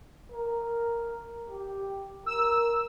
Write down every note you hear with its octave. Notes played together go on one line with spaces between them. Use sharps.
A#4
G4
A#4 E6